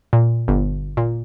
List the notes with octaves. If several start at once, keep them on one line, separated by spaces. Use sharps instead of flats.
A#2
G1
A#2